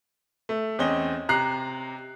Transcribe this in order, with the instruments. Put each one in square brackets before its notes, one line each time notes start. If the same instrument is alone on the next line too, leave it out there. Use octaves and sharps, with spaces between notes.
[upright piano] A3
E2 C4 C#4 D#5 G7
C3 A#5 F#6 C7